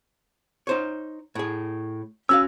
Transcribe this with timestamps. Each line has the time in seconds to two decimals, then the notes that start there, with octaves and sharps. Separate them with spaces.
0.67 D#4 C5 C#5
1.35 A2 G#4
2.29 C#4 F#4 F5 E6